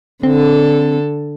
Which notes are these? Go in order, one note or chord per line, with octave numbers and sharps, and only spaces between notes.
D3 C4 A4